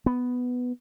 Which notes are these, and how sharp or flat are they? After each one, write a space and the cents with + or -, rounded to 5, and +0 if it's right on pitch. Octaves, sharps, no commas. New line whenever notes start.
B3 +5